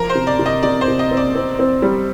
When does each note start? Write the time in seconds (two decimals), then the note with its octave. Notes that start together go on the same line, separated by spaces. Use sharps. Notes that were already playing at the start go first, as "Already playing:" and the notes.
Already playing: F3 A#4
0.10 C5
0.15 C3
0.27 D5
0.39 C3
0.46 D#5
0.63 C3 D5
0.81 C5
0.88 C3
0.99 D#5
1.11 C4
1.17 D5
1.35 C4
1.59 C4
1.82 G3